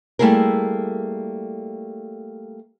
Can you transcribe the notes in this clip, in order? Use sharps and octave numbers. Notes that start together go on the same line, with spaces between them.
G3 A3 A#3 E4 G#4 A#4